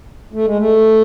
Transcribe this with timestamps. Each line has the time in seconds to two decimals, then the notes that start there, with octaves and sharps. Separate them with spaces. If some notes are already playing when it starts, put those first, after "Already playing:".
0.33 A3
0.45 G#3
0.58 A3